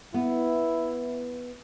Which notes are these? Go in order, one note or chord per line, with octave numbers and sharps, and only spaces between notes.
B3 E4